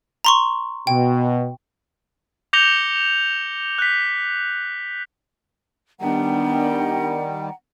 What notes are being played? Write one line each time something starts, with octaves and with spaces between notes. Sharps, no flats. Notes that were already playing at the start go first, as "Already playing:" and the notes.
A#5 C6 C#6
B2 G5
D6 G6 A#6 C#7 F7 G7
F#6 B6
D#3 G3 B3 D4 F#5 G5 A#5